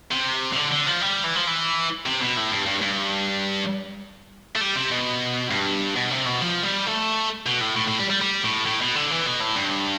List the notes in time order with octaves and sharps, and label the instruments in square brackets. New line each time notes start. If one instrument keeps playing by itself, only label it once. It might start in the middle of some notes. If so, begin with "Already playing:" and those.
[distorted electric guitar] C3
C3
D3
D3
F3
G3
E3
F3
E3
C3
B2
A2
G2
G2
G2
A3
G3
C3
B2
G2
B2
C3
B2
F3
G3
A3
B2
A2
A2
A2
G3
G3
G3
A2
A2
B2
D3
E3
B2
A2
G2